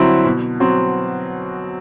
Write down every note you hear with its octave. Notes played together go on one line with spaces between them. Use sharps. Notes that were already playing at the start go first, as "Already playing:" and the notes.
Already playing: D3 F#3 C4 E4
B2
F#3 C4